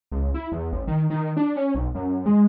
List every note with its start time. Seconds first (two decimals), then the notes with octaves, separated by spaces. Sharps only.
0.12 C#2
0.34 E4
0.52 E2
0.72 A1
0.87 D#3
1.10 D#3
1.37 D4
1.56 C#4
1.75 B1
1.95 F#2
2.26 G#3